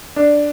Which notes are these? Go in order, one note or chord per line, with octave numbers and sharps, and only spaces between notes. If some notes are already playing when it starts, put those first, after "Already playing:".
D4